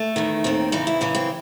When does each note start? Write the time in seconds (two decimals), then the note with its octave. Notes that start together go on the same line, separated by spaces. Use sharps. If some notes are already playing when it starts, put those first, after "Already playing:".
Already playing: A3
0.16 E2 D#3
0.44 D#2 D#3 C4
0.72 E2 C#3 E3 D#4
0.87 E4
1.01 F#2 C#3 E3 C#4
1.15 C4